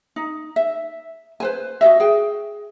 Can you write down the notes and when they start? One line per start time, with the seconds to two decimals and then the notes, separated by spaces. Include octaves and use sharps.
0.16 D#4
0.56 E5
1.40 B4 C5 G#5
1.81 F#4 G#4 D#5 E5
2.00 G#4 G5